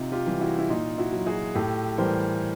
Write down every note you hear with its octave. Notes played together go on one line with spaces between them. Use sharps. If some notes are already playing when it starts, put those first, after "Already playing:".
Already playing: C3 D#4 F4
F4 G4
E3 G3
E4 F#4
E4
A#2 D#4 F4
E4 F#4
F#3
F#4 G#4
A2 G4 A4
E3 G3 A#4 C5